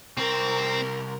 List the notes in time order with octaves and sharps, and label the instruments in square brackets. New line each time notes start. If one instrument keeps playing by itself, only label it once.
[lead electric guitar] C2 A#5 [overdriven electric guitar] C4 [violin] A#4